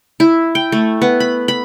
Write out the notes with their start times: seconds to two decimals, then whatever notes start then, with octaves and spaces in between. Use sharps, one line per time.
0.20 E4
0.55 G5
0.72 A3
1.02 B3
1.20 B5
1.48 B5